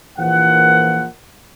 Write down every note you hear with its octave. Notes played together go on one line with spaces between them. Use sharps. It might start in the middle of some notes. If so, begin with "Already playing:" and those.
A#1 E3 F3 A#3 F#5